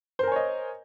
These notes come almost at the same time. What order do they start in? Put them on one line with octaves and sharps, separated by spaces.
C5 A#4 G#5 C#5 D#5